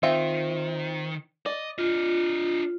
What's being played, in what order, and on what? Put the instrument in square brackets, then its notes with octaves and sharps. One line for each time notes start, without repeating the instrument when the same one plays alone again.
[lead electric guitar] D#3 [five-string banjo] C4 F4 E5
[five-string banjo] D5 [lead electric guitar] D#5
[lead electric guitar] D4 D#5 [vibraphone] F4